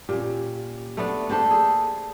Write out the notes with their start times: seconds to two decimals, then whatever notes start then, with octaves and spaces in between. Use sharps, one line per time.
0.09 A#2 C#4 G4
0.97 A3 B3 D4
1.29 A#3 D4 G4 A4 C5
1.51 G#4